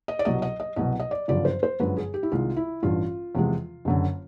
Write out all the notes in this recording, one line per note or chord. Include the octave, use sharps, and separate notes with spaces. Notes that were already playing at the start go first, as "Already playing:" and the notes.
D#5
D5
C2 B2 F#3 D#5
D#5
D#5
C2 B2 F#3 D#5
D#5
D5
G1 F#2 C#3 F3 D5
C5
C5
G1 F#2 D3 F3 G#3 B4
G#4
G4
E4
C2 C3 D#3 G#3 F4
E4
A1 G2 E3 F4
E2 C3 F3 G#3
F#1 F#2 D3